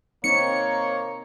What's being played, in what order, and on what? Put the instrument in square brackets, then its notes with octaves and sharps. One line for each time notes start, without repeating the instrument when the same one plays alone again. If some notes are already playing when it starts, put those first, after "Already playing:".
[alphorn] A#3 [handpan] C4 D#4 [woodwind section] C#5 [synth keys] C#7